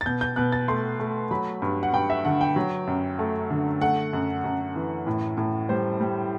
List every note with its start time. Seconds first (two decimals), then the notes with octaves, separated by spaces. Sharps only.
0.01 A6
0.06 B2 G6
0.21 G6
0.36 B2 F#6
0.52 A6
0.68 A3 C6
1.00 A3
1.31 F#3 B5
1.62 G2
1.83 F#5
1.93 G2 G5
2.10 E5
2.25 D3 F#5
2.41 G5
2.56 F#3
2.87 F#2
3.19 A3
3.50 D3
3.81 A3 F#5
4.13 F#2
4.44 F#2
4.76 E3
5.07 A2
5.38 A2
5.69 G3 C5
6.01 G3